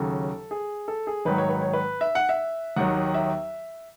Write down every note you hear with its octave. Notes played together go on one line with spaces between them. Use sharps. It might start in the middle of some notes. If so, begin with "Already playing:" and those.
Already playing: D#2 C#3 F#3 A4
G#4
A4
G#4
G#1 G#2 D#3 F#3 B4
C#5
B4
C#5
B4
E5
F#5
E5
D#2 D#3 F#3 F#5
E5